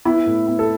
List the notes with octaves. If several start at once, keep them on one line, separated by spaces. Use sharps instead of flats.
B3 E4
A2
B3
A4